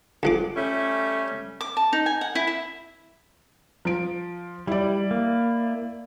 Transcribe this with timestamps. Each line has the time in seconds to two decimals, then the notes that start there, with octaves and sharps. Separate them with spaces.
0.23 D2 F3 D6
0.56 G3 A3 C#4
1.61 D6
1.77 A5
1.93 D#4
2.06 G#5
2.21 F#5
2.35 E4
2.47 E5
3.85 F3 D7
4.67 G3 E4 D5
5.11 A#3